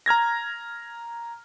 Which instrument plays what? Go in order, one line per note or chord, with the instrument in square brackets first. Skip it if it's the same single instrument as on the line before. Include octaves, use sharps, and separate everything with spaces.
[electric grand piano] A#5 F6 G#6 A#6